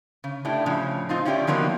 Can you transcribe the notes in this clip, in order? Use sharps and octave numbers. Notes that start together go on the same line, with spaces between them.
C#3
A2 D4 E4 G4
A2 C#3 F3
C4 D#4 F4
C#4 E4 F4 G4 C#5 D5
D#3 F3 F#3 A#3 B3